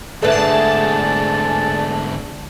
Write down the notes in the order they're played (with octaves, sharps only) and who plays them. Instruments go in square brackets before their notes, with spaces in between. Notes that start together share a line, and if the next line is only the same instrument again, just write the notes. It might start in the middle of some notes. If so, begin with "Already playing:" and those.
[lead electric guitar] G#2 D3 [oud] A3 B4 [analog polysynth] G#4 D5 A5